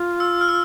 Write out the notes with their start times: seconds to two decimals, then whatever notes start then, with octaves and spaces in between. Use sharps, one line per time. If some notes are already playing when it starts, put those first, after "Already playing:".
Already playing: F4
0.20 E6
0.41 F6
0.49 E6